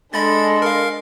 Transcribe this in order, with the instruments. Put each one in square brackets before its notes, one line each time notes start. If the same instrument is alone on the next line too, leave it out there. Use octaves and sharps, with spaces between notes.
[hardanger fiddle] G#3 [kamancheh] D4 A4 [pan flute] D#5 [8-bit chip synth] B5 A6
[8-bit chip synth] A#4 F5